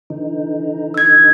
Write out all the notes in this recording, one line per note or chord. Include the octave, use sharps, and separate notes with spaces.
D3 E3 D#4
E6 G#6